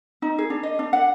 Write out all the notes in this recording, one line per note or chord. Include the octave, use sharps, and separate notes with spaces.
D#4
G#4
D4
D#5
D4
F#5